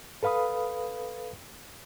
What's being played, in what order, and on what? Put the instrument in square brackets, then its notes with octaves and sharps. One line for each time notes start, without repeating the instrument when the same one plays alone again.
[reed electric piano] A4 B4 F5 B5 D#6